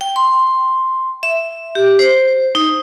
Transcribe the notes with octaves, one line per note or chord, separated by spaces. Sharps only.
G5
C6
E5
G4
C5
D#4